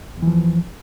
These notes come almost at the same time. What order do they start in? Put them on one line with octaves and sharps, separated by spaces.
E2 E3 F3